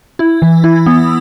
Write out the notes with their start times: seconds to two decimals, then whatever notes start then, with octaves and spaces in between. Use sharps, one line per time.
0.19 E4
0.42 E3
0.64 E4
0.86 B3